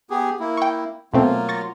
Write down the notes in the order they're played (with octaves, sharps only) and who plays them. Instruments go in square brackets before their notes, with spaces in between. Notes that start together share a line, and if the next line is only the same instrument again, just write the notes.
[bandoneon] B3 G4 G#4
A#3 E4
[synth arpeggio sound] G5 C#6
[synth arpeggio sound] B2 A3 C4 [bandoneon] F#3 A#3 F4
[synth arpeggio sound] C#6 A6 A#6